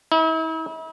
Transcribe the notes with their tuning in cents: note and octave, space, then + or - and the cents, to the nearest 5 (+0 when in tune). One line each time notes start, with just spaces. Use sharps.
E4 -40